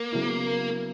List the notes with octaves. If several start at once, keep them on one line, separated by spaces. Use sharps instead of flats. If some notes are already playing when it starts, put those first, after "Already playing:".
Already playing: A#3
C#3 F#3 B3 E4